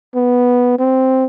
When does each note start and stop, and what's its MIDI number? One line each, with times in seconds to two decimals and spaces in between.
0.15 0.76 59
0.79 1.25 60